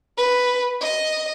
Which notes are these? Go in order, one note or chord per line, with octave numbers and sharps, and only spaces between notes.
B4
D#5